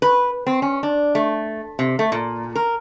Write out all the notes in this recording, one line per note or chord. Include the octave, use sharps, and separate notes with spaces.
B4
C4
C#4
D4
A3
C3
A3
A#2
A#4